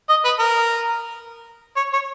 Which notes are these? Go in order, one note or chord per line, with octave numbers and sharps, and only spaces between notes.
D#5
B4
A#4
C#5
C#5